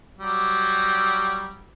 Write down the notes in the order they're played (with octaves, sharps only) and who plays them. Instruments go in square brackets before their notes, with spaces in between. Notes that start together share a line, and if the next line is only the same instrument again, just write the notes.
[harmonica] F#3 G3